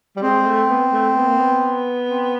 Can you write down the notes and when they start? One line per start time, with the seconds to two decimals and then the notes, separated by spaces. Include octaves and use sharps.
0.16 G3
0.22 G#3 C4
0.42 G#3
0.46 A3
0.69 B3
0.93 A3
1.16 B3
1.28 A#3
1.38 B3
2.09 C4